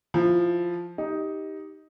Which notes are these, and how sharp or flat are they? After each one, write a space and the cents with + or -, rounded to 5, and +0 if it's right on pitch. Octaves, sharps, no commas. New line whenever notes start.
F3 +0 E4 +15
D#4 +10 G4 +0